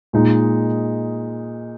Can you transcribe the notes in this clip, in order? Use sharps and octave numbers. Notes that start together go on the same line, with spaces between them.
A#2 G#3 D#4